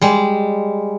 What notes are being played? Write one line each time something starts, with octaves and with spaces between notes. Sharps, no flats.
G3 G#3